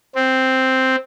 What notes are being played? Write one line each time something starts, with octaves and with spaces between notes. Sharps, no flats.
C4